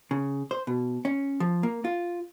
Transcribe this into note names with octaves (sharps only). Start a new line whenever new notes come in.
C#3
C5
B2
C#4
F3
A#3
F4